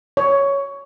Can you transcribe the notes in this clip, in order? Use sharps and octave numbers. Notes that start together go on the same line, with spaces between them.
C#5